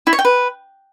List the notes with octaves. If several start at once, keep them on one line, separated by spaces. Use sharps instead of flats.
E4
C#5
G5
B4